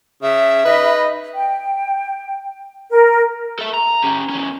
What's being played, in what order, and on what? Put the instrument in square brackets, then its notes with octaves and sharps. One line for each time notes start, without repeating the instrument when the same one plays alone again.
[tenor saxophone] C#3 [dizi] E5
[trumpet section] D#4 D#5 B5 [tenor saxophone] B4
[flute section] G5
A#4
[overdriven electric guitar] A4 E5
A#5
C#4 G4
E2 C#4